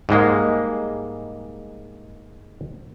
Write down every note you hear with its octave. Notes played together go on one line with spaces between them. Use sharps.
G#2 G3 G#3 A#3